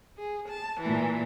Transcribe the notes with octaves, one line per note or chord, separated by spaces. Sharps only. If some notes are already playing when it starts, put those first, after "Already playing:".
G#4
A5
A#2 E3